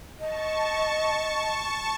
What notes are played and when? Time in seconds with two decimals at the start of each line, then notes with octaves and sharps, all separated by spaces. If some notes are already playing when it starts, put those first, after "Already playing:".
0.20 D#5 A5 C#6